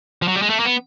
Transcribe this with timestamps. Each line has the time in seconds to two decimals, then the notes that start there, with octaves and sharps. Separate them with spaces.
0.22 F3
0.28 F#3
0.36 G3
0.42 G#3
0.50 A3
0.60 A#3
0.65 B3